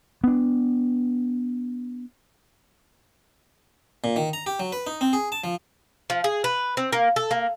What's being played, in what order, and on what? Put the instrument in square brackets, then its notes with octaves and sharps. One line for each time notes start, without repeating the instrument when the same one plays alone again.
[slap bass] B3 D4
[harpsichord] A#2
D#3
A#5
G4
F#3
B4
D#4
C4
G#4
A5
F3
[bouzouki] F3
G#4
B4
C4
A#3
A4
A#3